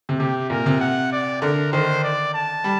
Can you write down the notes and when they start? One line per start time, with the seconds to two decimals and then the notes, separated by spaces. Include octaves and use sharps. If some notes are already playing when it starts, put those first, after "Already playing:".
0.09 C3
0.19 C3 G4
0.50 A#2 A#4
0.66 C3
0.80 F#5
1.12 D5
1.42 D3 A#4
1.73 D#3 C5
2.04 D5
2.34 A5
2.64 G3